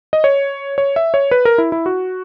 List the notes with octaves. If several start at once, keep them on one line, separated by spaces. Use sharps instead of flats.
D#5
C#5
C#5
E5
C#5
B4
A#4
E4
E4
F#4